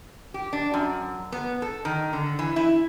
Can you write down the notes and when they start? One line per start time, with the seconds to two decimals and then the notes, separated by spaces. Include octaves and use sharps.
0.34 G4
0.53 D4
0.74 F#2
1.32 B3
1.62 A4
1.85 D#3
2.13 D3
2.39 E3
2.56 E4